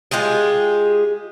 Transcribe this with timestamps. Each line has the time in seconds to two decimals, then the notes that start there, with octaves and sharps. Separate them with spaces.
0.11 G#3 F4 G4 G#4